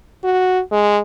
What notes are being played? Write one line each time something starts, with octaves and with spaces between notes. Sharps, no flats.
F#4
G#3